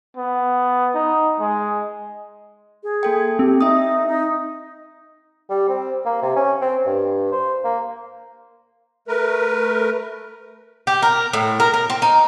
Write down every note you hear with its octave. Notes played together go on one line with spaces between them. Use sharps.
B3
D#4
G#3
G#4
A#3 A4 G5
C4 G4
D#4 E5 D#6
D#4
G3
C4
A#3
C3
C#4
C4
G2
C5
A#3
A3 A#4 B4
G4
A#4
A2
A#4
A#4
C4
D#4